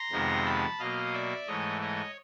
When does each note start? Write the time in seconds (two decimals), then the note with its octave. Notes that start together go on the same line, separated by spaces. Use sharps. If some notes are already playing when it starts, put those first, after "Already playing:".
Already playing: A#5 C6
0.11 F2 C3 D#3 G#3 B3
0.46 A5 B5
0.79 B2 F#3 A#3 D#5 F5
1.13 D5 E5
1.47 G#2 E3 A3 C#5 D#5
1.81 C#5 D#5